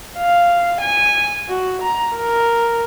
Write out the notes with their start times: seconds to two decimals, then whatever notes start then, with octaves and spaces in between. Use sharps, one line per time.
0.17 F5
0.81 G#5
1.49 F#4
1.82 A#5
2.16 A#4